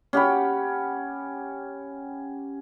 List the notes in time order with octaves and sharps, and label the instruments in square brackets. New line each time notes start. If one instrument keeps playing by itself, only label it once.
[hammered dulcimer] C#4 G4 F#5 B5